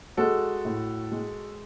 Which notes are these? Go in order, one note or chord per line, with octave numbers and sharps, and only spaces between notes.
G#3 F#4 A4
A2
G#3